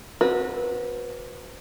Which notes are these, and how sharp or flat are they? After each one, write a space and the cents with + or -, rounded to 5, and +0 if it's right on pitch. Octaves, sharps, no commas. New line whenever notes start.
C4 +0 F#4 -15 B4 -30